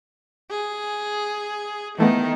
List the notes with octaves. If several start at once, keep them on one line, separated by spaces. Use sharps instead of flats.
G#4
D#3 E3 A3 B3